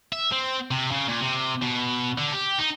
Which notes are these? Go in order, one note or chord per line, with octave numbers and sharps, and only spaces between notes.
E5
C4
C3
C#3
A#2
C3
B2
D3
G4
D#4